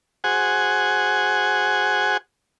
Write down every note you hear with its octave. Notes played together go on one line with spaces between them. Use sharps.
F#4 G#4 C5 F#5 G#5